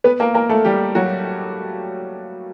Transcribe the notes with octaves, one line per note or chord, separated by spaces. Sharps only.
B3 B4
A#3 A#4
A#3 A#4
A3 A4
G3 G4
F#3 F#4